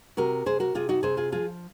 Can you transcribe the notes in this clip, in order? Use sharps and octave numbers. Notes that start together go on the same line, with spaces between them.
C3 F#4 A#4
C3 G#4 C5
F#4 A#4
C3 F4 G#4
D#4 F#4
C3 G#4 C5
F4 G#4
F3 F4 G#4